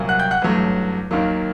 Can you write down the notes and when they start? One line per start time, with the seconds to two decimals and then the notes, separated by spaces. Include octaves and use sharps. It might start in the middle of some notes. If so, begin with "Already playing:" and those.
Already playing: C2 A#2 F#3 A#3
0.09 F#5 F#6
0.19 G5 G6
0.31 F#5 F#6
0.42 A1 G2 F#3 A3
1.11 D#2 D#3 F#3 A#3